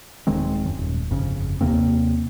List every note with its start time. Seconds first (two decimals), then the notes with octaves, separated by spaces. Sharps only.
0.27 D#1 D#3 G#3 C4
0.66 F#2
0.77 D#1
1.11 G1 F2 C#3
1.61 D#2 C3 A#3 C4